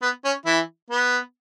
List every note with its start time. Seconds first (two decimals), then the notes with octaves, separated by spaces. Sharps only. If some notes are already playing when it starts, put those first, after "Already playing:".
0.02 B3
0.25 C#4
0.46 E3 E4
0.91 B3